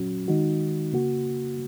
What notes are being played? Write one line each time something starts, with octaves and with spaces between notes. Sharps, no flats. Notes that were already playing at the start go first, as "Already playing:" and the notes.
Already playing: A#2 F#3 C#4 F#4
D#3 G#3 D#4 F#4
C#3 A#3 F#4